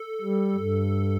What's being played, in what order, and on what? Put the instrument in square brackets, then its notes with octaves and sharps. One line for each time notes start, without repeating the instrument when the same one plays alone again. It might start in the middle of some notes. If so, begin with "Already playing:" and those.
Already playing: [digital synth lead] A4
[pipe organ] G3
G2